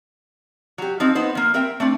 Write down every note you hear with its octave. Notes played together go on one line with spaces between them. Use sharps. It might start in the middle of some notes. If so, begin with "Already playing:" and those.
F#3 G4
F3 C4 D#4
B3 D#4 C5
F3 A#3
C4 A#4 E5 G5
A3 C4 D4